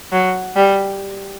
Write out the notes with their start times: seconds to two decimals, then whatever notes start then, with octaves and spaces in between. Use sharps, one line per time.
0.12 F#3
0.56 G3